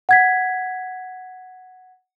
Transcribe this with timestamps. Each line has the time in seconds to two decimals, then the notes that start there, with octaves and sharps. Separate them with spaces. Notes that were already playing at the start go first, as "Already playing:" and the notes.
0.09 F#5 G#6 B6